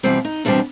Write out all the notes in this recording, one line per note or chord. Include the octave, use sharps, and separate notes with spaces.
E2 B2 G3 C4
D#4
E2 B2 G3 C4 D4